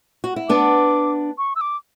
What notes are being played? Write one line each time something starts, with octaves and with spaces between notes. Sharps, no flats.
F#4
E4
B3 D4 D6
C#6
E6
D6